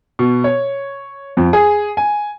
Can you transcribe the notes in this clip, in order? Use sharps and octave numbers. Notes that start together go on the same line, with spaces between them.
B2
C#5
F2
G#4
G#5